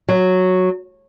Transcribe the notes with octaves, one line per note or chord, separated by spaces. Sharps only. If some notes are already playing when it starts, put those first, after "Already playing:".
F#3